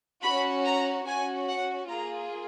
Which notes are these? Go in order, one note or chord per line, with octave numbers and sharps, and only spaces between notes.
C#4 F#4 B5
A#5
C#4 F#4 G#5
F#5
A#3 F4 G#4 A#5